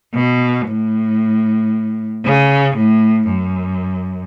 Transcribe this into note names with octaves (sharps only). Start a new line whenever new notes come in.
B2
A2
C#3
A2
F#2